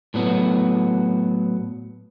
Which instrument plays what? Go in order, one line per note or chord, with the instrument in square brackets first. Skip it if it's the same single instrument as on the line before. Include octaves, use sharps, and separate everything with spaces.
[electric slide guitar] A2 F#3 B3 F#4